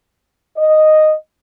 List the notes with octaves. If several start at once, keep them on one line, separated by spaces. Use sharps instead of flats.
D#5